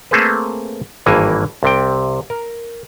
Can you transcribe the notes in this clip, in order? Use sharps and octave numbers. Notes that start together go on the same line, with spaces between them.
A3 A#3 C4 G#4 A4 B4
G#1 G2 E3 A#3 G#5
C2 C3 G5
A#4